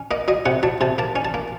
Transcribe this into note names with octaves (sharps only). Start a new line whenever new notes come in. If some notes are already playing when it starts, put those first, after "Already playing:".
Already playing: C#4
A#3 D#5
F#3 D#5
C3 F#5
F#3 A5
C3 A5
A#3 A5
C#4
A5
A#3